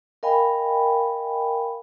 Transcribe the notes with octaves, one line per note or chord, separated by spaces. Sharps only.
A#4 D#5 F5 G5 G#5 B5